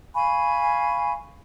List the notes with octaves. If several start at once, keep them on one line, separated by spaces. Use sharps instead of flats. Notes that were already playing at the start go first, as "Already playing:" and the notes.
F5 G#5 B5 C#6